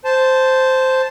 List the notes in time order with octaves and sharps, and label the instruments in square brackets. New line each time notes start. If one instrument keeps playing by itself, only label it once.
[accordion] C5 A5